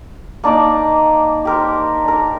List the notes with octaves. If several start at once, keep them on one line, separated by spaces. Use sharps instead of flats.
A#3 D4 D#4 D5
G4 A#4 C5
D4 A#4